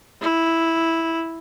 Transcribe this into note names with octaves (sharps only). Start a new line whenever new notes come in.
E4